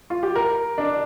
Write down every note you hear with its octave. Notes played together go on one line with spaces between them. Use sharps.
F4
G4
A#4
D4